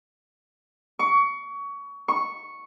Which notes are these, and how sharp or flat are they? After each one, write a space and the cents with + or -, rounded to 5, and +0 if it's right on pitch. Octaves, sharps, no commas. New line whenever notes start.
C#6 +25
C#6 -5